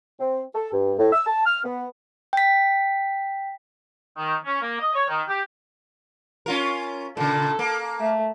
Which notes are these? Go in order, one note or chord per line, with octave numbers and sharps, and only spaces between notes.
C4
A4
G2
A2
E6
A5
F6
B3
G5 B6
D#3
C#4
A#3
D#5
C#5
D#3
G4
C#4 F4 A#4
A#2 C#3 A4
A#3
A3